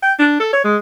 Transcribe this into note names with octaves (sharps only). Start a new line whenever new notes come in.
G5
D4
A4
C#5
G#3